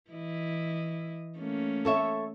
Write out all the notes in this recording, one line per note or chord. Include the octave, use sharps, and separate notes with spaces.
E3 E4 D#5
A3 A#3 C#4
A4 C#5 E5